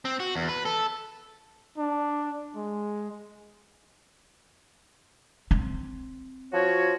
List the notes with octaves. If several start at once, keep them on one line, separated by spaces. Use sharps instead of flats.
C4
F#4
E2
B4
A4
D4
G#3
C4
F3 F#4 C#5